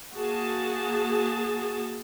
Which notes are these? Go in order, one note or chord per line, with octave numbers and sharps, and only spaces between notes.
A#3 F#4 G#4 A5